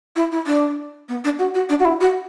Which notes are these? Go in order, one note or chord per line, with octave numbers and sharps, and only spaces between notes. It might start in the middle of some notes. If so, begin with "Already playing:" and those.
E4
E4
D4
B3
D4
F#4
F#4
D4
F#4
E4
F#4